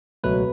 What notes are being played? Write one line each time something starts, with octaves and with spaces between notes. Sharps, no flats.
C#2 B2 F#3 A3 B4